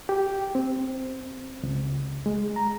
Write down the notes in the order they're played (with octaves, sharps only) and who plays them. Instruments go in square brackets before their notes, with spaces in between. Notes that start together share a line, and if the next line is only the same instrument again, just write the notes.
[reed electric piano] G4
C4
C#2
G#3
A#5